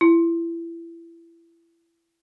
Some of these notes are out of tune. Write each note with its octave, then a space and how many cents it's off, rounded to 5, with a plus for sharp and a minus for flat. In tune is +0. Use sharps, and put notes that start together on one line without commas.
E4 +25